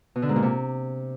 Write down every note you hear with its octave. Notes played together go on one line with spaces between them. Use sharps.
B2
D3
G#2
A#2
C3